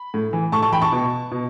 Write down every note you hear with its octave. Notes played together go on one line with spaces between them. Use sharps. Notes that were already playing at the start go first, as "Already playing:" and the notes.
Already playing: B5
A2
E3
A2 A5 C#6
A5 C#6
E3 G5 B5
A5 C#6
B2
B2